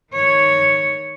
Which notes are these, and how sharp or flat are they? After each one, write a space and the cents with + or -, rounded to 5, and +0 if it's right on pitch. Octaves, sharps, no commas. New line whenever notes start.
D#3 +0 C#5 +0